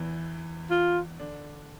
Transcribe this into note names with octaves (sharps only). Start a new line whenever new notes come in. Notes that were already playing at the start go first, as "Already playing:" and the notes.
Already playing: E2 E3
F4
D3 D4